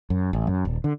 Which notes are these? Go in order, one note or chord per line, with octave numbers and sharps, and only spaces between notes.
F#2
A1
F#2
D#1
D3